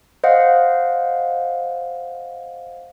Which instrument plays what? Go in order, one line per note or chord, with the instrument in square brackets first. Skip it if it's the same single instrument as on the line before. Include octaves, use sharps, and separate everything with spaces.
[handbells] C5 D#5 F5 F#5